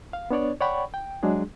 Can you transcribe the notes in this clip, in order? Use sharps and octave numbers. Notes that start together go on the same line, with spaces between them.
F5
B3 D4 C#5 D5
C#5 D5 F#5 G5 B5 C#6
G5
F#3 G#3 D4 G#4